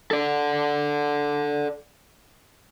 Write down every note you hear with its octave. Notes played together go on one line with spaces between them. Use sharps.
A4 D5